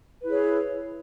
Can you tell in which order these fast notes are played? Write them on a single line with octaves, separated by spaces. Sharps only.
B4 E4 G#4 C#5